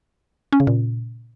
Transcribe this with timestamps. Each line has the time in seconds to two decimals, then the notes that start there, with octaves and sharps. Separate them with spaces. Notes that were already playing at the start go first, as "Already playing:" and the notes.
0.52 C#4
0.60 C#3
0.67 A#2